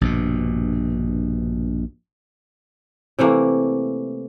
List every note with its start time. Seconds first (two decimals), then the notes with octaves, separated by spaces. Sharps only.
0.01 A#1 G2 B2
3.19 C3 E3 A3 A#3